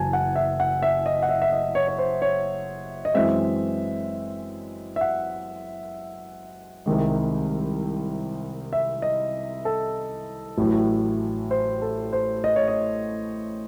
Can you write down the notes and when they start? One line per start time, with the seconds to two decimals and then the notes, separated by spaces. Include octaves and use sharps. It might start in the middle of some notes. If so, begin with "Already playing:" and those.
Already playing: F#1 F#2 E3 G#5 A5
0.13 F#5
0.36 E5
0.60 F#5
0.82 E5
1.06 D#5
1.23 F#5
1.29 E5
1.42 E5
1.52 D#5
1.75 C#5
1.88 C#5
1.99 C5
2.22 C#5
3.05 D#5
3.14 F#2 E3 G#3 C4 E5
4.96 E5
5.01 F#5
6.86 C2 C3 D#3 G#3
8.73 E5
9.02 D#5
9.65 A4
10.58 A1 A2 F#3
11.51 C5
11.82 A4
12.13 C5
12.44 D#5
12.56 C#5
12.68 D#5